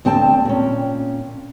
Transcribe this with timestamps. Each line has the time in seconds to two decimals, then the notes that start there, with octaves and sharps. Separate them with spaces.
0.05 D2 C4 G5 A5
0.45 A#2 C#4